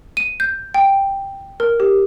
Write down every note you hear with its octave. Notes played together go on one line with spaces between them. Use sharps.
D#7
G6
G5
A#4
G4